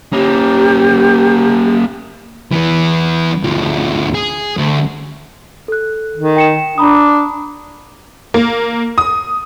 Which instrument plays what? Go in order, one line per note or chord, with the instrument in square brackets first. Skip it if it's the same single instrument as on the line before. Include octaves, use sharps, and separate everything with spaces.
[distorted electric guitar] A#3 C#4 [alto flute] G4
[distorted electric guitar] E3 B3
D2 F3
G#4
D2
[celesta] A4 F#6
[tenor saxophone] D#3
[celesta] G5 C#7 E7
[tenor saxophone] D4 [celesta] A#5 B5 D#6
[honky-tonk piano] A#3
D#6